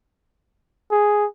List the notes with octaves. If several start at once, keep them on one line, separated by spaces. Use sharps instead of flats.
G#4